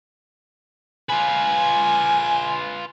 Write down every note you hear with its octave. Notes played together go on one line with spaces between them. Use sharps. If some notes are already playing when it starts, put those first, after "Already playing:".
F4 B4 G#5